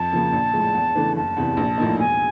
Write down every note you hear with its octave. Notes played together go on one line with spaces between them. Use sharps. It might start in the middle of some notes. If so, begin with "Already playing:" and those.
Already playing: F2 A5
C#3 F3 A#3
A#1
A2 F3 G#3
E2
C#3 E3 A3 D4
F#1 A5
E2 C3 E3
A#1
A2 F3 A#3 D#4
E1 G#5